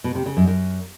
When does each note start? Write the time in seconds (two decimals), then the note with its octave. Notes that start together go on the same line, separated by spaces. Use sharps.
0.04 B2
0.15 C3
0.26 C#3
0.37 F#2
0.48 F#2